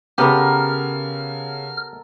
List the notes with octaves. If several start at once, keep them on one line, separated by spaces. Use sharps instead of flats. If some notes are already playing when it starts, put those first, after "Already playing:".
C#3 B3 G4 A4 A#4 F#5 F6